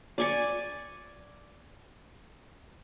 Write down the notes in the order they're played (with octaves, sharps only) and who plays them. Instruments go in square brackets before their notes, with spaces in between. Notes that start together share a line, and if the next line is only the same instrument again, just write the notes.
[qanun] D5 G#5 C#6